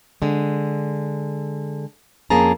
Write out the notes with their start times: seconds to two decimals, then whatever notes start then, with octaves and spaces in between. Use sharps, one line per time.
0.22 D3 G#3
2.30 F2 A#3 C#4 G#4 A5 A#5